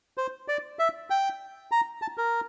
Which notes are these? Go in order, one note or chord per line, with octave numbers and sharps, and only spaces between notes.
C5
D5
E5
G5
A#5
A5
A#4